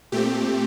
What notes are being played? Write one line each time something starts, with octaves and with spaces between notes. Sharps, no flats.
A#2 A3 C4 G4